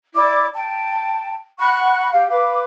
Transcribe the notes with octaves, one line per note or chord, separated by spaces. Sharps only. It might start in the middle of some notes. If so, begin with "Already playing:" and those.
E4 D5 D6
G5 A5
F#5 B5 C#6 F#6
G4 F5
B4 F5 D6